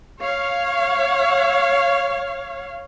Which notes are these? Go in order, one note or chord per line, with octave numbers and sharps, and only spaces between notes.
C#5 F5